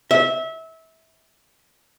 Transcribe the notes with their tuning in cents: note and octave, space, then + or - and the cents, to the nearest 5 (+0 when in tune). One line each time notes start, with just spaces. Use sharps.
E5 -25